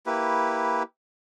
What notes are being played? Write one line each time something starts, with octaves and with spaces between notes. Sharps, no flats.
A#3 E4 G4 B4